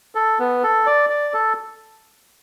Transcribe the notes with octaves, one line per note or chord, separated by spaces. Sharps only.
A4
B3
A4
D5
D5
A4